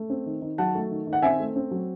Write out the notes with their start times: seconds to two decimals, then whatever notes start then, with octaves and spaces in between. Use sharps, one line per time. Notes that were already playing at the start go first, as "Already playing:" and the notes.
Already playing: A3
0.10 C4
0.26 D#3
0.42 D#3
0.58 F#3 F#5 A5
0.75 A3
0.91 D#3
1.07 D#3
1.13 F#5
1.22 C4 E5 G#5
1.40 A3
1.56 C4
1.71 F#3